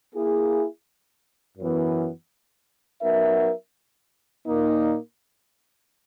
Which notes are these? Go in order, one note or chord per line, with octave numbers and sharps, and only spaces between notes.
A#3 E4 G#4
F#2 E3 B3
F#3 B3 D#4 A#4 E5
A#2 A#3 D#4